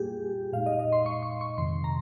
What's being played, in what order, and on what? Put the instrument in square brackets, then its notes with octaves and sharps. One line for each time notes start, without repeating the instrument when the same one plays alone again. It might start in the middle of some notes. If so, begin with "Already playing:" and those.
Already playing: [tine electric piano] A#2 G3 A#3 F4 [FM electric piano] G4 G#4
[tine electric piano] A#2 G#3 D#4 [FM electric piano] F5
[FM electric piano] D#5
D#5
C6
C#6
C#6
C#6
[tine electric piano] F2 C3 D#3 [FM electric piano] C6
[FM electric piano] A#5